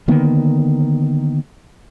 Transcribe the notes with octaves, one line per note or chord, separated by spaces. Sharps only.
D3 D#3 A#3 B3